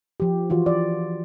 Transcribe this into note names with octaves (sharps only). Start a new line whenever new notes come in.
F3 G4
E3 F4 F#4
D5